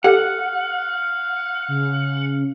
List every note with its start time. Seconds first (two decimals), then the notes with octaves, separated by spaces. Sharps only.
0.04 G4 A4 F5 F#5
1.68 C#3